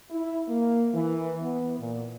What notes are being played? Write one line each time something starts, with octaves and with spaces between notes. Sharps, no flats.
E4
A#3
E3
B3
A#2